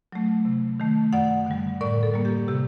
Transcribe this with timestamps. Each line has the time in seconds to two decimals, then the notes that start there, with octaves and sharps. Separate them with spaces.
0.12 F#3 A3
0.45 C3
0.80 D#3 A3
1.13 F#2 D5 F#5
1.46 D3 G3
1.81 A2 A#4 D5
2.03 A4
2.14 G3 A#3
2.25 G4
2.48 C3 G4